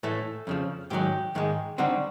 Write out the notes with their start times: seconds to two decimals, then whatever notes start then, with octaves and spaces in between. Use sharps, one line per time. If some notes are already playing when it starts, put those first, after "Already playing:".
0.03 A2 E3 A3 A4 A5
0.47 F2 C#3 F3
0.90 G#2 D#3 F#3 G4 G5
1.35 G#2 D#3 G#3
1.78 D3 G3 C4 D#4 F#4 F#5